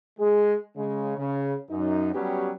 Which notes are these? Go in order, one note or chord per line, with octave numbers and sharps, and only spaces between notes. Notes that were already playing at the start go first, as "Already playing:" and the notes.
G#3 G#4
C#3 G#3
C#3
F#2 D#4
F#3 G3 B3 C#4 F#4 G4